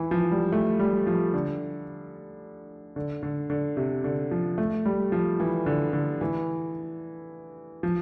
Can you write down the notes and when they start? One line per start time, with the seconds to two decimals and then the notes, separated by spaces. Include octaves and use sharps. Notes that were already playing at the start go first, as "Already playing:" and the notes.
Already playing: E3
0.11 F3
0.31 G3
0.52 A3
0.80 G3
1.07 F3
1.34 D3
2.96 D3
3.23 D3
3.50 D3
3.77 C3
4.04 D3
4.31 F3
4.58 A3
4.85 G3
5.12 F3
5.40 E3
5.66 D3
5.93 D3
6.21 E3
7.83 F3